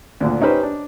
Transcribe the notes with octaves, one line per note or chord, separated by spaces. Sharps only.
D2 A#2 D3
C#4 D#4 G4 B4 C5
D4